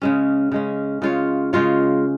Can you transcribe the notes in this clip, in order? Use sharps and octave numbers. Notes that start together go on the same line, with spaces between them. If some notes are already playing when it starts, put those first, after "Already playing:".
C#3 G#3 C#4
C#3 G#3 C#4
C#3 G#3 F4 C#5
C#3 G#3 F4 C#5